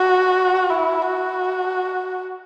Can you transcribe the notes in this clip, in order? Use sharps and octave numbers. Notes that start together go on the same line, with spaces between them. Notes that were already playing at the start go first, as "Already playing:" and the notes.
Already playing: F#4
E4
F#4